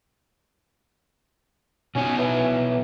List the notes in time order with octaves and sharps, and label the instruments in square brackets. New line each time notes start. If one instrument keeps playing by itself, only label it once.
[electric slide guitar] B2 D#4 C#5 [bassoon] C#4
[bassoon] E3